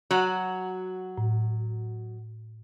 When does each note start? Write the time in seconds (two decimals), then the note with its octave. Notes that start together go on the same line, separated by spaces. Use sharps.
0.11 F#3 F#4
1.18 A2